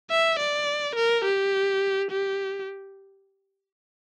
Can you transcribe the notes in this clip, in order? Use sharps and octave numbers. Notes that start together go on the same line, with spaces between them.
E5
D5
A#4
G4
G4